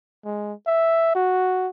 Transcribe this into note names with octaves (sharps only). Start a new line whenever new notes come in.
G#3
E5
F#4